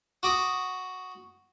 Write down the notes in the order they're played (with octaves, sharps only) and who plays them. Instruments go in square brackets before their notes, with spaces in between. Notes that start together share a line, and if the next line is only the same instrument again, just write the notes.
[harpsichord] F#4 D6 D#6